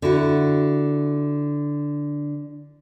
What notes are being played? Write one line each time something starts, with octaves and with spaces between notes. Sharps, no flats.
D3 E4 F#4